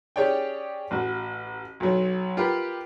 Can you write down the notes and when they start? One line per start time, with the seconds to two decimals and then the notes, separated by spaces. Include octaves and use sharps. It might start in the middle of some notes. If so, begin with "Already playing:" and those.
0.16 C#4 G4 G#4 C#5 D5 G5
0.91 A1 F#4
1.80 B1 F#3
2.37 F4 G4 A#4 B4